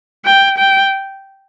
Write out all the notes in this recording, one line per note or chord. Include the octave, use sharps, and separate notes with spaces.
G5
G5